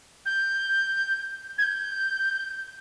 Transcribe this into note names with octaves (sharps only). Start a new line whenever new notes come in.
G6
G#6
G6